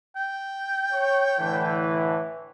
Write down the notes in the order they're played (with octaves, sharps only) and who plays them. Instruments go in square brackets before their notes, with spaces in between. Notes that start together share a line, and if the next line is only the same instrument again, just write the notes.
[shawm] G5
[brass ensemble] C#5
A2 D3 E3